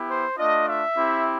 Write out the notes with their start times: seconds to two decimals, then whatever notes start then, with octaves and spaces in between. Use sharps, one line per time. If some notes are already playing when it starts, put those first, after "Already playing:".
Already playing: B3 E4 G4
0.08 C5
0.37 A3 D4 F4 D#5
0.66 E5
0.95 C4 E4 G4